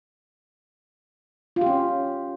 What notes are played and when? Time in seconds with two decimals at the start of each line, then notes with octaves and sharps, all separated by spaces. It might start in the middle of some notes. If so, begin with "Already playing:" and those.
1.56 F4
1.61 G4
1.66 C#4